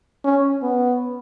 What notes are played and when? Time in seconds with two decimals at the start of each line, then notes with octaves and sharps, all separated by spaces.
0.25 C#4
0.63 B3